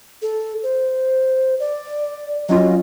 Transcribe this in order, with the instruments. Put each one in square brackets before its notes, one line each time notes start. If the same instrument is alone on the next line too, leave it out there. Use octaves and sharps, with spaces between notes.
[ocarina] A4
C5
D5
[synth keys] F#3 C#4 F4 [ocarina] D#5